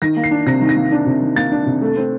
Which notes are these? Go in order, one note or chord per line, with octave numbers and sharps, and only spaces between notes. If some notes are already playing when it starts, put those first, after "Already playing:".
D#3 A#6
A#3
C7
D4
C3 A#6
D#3
A#6
A#3
D4
C3
D#3
A#3 A6
D4
C3
A3
C4